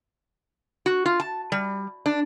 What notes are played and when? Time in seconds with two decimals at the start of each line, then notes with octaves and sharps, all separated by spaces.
0.86 F#4
1.06 F4
1.20 A5
1.52 G3
2.06 D4